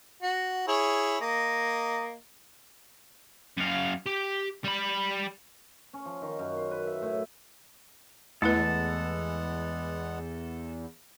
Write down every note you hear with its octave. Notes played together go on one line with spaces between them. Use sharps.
F#4
E4 G#4 C#5
A#3 D#5
F#2 F5
G4
G3 B5
C#4
F3
D#3
F#2
C5
B4
E5
A2
E2 G#3 A3 B3 E4 A4 B4 F#5